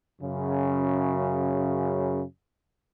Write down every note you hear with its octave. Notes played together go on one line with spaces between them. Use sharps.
F#2 C#3